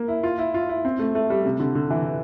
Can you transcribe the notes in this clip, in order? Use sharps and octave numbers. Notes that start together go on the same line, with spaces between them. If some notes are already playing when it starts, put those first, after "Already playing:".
Already playing: A#3
E4
F4
E4
F4
E4
C4
A3
A3
G3
C3
D3
D3
E3